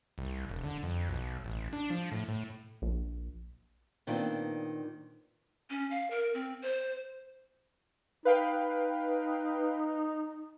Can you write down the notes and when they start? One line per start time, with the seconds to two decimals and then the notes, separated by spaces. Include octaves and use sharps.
0.18 C2
0.49 E1
0.64 D3
0.83 F2
1.09 B1
1.44 A1
1.73 D4
1.90 F3
2.12 A2
2.28 A2
2.82 A#1
4.07 A#2 D#3 B3 C4 D4 F4
5.70 C#4
5.91 F5
6.10 A#4
6.34 C4
6.62 C5
8.25 D#4 B4 F5 G5